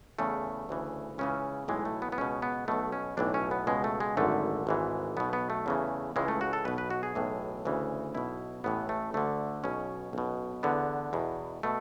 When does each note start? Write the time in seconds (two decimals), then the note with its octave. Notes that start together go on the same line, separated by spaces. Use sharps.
0.19 E2 C#3 E3 A3
0.69 D2 C#3 E3
1.18 C#2 C#3 E3 C#4
1.68 B1 A2 E3 G#3
1.85 A3
2.02 B3
2.12 B3
2.18 C#2 B2 C#4
2.42 B3
2.68 B1 B2 A3
2.92 C#4
3.17 B1 A2 E3 D4
3.34 C#4
3.51 B3
3.67 C#2 B2 G#3
3.84 A3
4.00 G#3
4.17 G#1 F#2 D3 A3
4.67 G#1 G#2 E3
5.17 B1 B2 B3
5.33 B3
5.50 A3
5.66 E2 C#3 E3
6.16 C#2 C#3 E3 G#3
6.28 A3
6.41 F#4
6.53 A4
6.65 B1 B2 B4
6.78 B4
6.90 F#4
7.03 G#4
7.15 B1 A2 E3
7.65 D2 C#3 E3
8.15 B1 B2 E4
8.64 A1 A2 E3 B3
8.89 A3
9.14 D2 D3 A3
9.64 B1 B2 C#4
10.13 B1 B2
10.63 E2 D3 B3
11.13 E2 B2
11.63 B2 A3